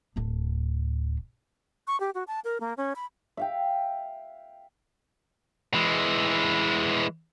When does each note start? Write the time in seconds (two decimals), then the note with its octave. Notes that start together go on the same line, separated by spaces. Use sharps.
0.16 D1 D4
1.87 C#6
2.00 G4
2.15 F#4
2.27 A5
2.44 A#4
2.61 A#3
2.77 C#4
2.96 B5
3.37 E5 F5 G5
5.74 E3 G#3